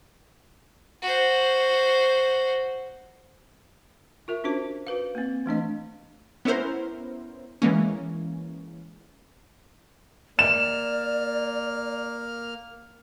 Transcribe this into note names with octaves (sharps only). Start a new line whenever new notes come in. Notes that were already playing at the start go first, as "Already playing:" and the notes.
F#4 C5
F4 A#4 E5
C#4 D4 F#4 C5
F#4 B4 F5
A#3 C4
E3 A3 D4 D#5
B3 C#4 E4 A#4 C5
E3 G#3 A#3 C#4
A#3 D5 F6 E7